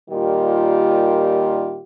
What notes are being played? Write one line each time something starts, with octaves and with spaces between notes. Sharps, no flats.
A#2 D#3 G3 F4 G4